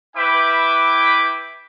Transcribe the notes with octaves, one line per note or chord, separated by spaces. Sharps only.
E4 B4 E5 G5 B5 D6